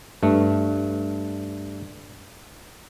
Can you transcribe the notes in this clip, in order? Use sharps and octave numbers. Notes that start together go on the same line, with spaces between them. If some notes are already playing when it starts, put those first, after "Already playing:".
G2 A3